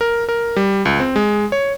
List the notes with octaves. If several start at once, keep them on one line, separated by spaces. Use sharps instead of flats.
A#4
A#4
G3
C#2
C4
G#3
C#5